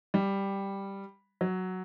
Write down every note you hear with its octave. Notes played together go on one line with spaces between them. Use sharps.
G3
F#3